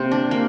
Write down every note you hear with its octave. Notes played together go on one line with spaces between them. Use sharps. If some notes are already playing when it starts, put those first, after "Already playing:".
Already playing: C3 A#3 C4 G4
D4
A#3